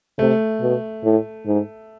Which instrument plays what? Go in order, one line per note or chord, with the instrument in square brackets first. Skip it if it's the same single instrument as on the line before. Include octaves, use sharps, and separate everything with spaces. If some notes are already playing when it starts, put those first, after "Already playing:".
[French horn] C3 [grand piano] A3
[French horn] B2
A2
G#2